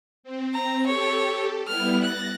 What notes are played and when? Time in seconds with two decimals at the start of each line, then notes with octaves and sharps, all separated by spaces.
0.23 C4
0.55 A#5
0.86 G4 A4 C#5
1.67 G3 B3 E4 F6
2.03 F#6 A6 A#6